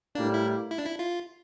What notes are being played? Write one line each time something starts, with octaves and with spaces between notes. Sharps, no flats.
A2 G3 A#3 D4
E4
E4
D4
E4
F4